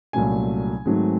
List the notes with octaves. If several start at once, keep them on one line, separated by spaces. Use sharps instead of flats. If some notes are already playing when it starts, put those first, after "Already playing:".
C2 A#2 F#3 A3 C#4 G#5
G#2 D#3 F#3 A3 C4